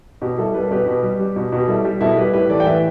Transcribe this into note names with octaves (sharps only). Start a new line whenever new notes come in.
B2 G4
G3 E4 A4
G3 B4
A4
B2 G4 B4
B2
G3
G3
B2
B2
G4
G3 E4 A4
G3 G4
B2 E4 A4
G3 G4 B4
A2 G4 B4
E3 A4 D5
G5
A2 B4 E5